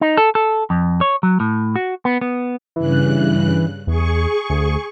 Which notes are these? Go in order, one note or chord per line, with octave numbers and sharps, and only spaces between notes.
D#4
A4
A4
F2
C#5
F#3
A2
F#4
B3
B3
G2 C#3 E3 F#6
E2 G#4 C#6
D2